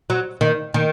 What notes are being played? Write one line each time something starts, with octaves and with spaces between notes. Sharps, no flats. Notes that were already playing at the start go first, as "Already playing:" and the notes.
F#3
D#3
D#3